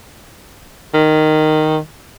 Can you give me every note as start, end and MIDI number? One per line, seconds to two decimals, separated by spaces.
0.94 1.79 51